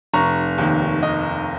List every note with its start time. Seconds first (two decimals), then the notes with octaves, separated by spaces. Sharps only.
0.13 F1 A#5 C#6
0.58 D#2 D#3
1.02 F1 D#5